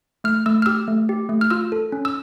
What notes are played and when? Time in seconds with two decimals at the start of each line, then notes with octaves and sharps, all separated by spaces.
0.24 A3 F6
0.46 A3 E6
0.62 F6
0.66 G4 E6
0.88 A3
1.09 G4
1.29 A3
1.41 F6
1.50 F4 E6
1.72 A4
1.92 C#4
2.05 E6